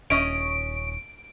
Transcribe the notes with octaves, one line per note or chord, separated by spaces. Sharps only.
D#1 C#4 D#5 D7